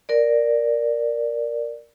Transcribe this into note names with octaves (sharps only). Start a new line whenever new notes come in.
A#4 D5